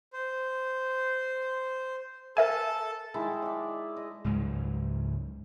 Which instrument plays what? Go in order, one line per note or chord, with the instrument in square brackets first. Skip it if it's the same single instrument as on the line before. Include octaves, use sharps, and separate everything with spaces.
[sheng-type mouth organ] C5
[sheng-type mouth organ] A4 A5 [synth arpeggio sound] A#4 E5 G#5
[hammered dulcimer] D#3 G#3 E4 A5
D5 E5
D#5
[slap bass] C#2 G#2 F#3 G#3